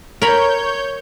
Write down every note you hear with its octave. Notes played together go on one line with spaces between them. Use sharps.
A#4 C#5 B5 G6